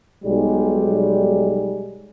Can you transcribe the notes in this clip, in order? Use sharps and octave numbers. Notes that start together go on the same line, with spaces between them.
B1 G3 G#3